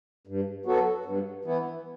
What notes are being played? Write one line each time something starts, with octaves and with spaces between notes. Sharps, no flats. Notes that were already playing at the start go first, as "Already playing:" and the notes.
G2
F#3 B3 F#4 A4
G2
E3 B3 E4